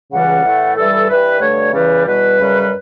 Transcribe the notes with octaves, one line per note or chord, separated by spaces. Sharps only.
C#2 C#3 E3 G3 F#5
A2 E3 A3
G2 E3 G3 A4
G2 E3 G3 B4
G2 D3 A3 C#5
E2 C#3 E3 G3 B4
E2 B2 G3 B4
F#2 C#3 G3